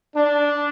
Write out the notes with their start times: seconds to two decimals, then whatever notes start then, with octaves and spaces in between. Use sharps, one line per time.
0.15 D4